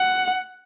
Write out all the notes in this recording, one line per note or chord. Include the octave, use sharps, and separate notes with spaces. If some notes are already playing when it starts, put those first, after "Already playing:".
Already playing: F#5